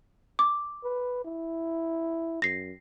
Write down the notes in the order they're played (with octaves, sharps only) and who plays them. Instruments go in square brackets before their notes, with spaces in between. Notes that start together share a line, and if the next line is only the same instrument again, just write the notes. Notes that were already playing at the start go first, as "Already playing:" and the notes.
[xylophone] D6
[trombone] B4
E4
[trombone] F#2 [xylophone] A#6 C7